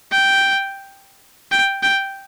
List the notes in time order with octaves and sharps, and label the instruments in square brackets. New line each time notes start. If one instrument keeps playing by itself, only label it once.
[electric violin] G5
G5
G5